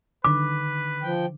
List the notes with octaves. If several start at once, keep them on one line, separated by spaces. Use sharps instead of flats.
D3 D#3 B4 D6
F3 G5